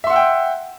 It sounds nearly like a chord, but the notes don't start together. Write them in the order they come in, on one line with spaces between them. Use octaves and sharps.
E5 C6 F#5 E6 G5